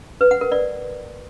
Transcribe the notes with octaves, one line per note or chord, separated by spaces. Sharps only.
B4
F#5
A#4
D5